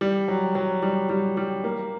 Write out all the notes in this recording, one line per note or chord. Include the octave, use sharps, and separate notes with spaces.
G3
F#3
F#3
G3
G3
G3
A#3